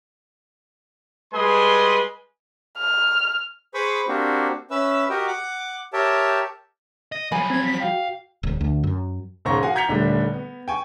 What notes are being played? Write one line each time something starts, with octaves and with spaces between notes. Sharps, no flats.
G3 G#3 B4 G#5 C6 D#6
F6
G#4 B4 C5 B5 C#6 D#6
A#3 C4 D4 F#4 G4
C#4 B4 E5 E6
F#4 G4 A#4 D#5 G5
F#5 D6
G4 A#4 C#5 E5 G5 A5
D#5
F3 F#3 G#5 B5
C4 G#6
B6
F#4 F5 G5
D1
D2
F#2
E1 G#2 C#3 C5 C#6 A#6
F#4 F5 F#5 G#5
A#5 G6 G#6 B6 C#7 F7
D#1 D3 G3 A3 D4
B3
G5 G#5 C#6